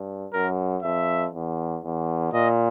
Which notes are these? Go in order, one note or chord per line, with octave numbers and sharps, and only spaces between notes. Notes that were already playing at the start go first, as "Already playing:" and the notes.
Already playing: G2
F#2 A#4
F2 E5
E2
E2
A#2 D#5